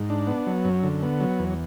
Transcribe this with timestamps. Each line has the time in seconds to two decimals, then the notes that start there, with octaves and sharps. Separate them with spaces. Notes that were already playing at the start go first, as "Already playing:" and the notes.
Already playing: G#2
0.10 D4
0.27 B3
0.46 F#3
0.65 F#2
0.83 D3
1.02 B3
1.20 F#3
1.39 E2